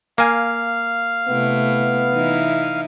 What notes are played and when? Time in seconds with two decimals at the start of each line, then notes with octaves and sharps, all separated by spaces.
0.18 A#3 F5 G#5
1.29 C3 A3 B3 E4
2.13 E3 D#4 E4